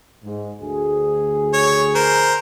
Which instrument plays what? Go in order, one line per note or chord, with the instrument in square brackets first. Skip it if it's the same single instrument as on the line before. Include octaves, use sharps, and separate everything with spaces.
[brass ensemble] G#2
D2 G#4
[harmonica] C#5
A#4 C5